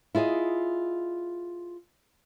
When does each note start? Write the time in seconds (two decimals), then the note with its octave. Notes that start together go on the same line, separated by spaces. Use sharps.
0.15 E4 F4 G#4 D#5